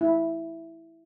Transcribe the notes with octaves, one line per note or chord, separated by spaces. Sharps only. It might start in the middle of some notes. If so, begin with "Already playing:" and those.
E4